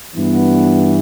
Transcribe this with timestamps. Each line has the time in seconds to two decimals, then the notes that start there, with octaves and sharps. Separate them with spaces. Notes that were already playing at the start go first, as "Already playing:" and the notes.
0.15 G2 E3 B3